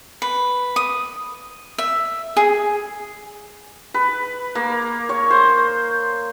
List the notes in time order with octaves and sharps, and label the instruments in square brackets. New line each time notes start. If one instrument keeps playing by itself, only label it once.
[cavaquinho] B4
D#6
E5
G#4
[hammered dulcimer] B4
A#3
C#5
C5